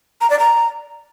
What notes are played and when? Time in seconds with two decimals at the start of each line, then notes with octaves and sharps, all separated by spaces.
0.21 A#5
0.30 D5
0.39 A#5